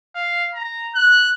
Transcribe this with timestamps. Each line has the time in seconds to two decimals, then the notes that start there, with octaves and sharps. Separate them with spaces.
0.15 F5
0.54 A#5
0.95 F#6